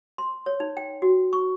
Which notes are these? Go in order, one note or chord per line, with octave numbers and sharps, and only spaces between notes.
C6
C#5
D#4
G5
F#4
C#6